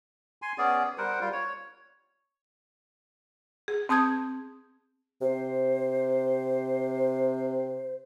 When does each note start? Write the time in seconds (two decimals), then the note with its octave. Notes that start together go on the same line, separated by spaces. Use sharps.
0.42 G#5 C6
0.58 B3 C#4 G#4 D5
0.98 G3 A#4 C5 F#5
1.20 G3 F4
1.32 C#5
3.68 G#4
3.89 C4 A5 D#6 G6 G#6
5.21 C3 C5